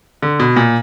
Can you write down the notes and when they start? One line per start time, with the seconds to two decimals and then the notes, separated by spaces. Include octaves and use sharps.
0.22 D3
0.40 B2
0.56 A#2